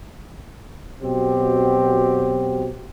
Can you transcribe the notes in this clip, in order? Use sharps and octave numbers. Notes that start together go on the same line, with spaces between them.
B2 F#3 C4 G4